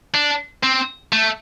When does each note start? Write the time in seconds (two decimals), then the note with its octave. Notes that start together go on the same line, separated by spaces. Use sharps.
0.14 D4
0.63 C4
1.12 A3